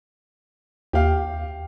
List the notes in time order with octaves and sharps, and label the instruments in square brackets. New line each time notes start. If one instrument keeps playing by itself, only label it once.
[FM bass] D#2 [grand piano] G4 F5